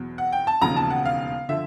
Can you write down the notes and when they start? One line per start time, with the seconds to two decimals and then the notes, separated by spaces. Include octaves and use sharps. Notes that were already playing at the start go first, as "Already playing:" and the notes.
Already playing: E2 B2 F#3
0.18 F#5
0.33 G5
0.47 A5
0.61 E1 D#2 C#3 F3 A#5
0.76 A5
0.90 F#5
1.06 F5
1.49 D3 F3 E5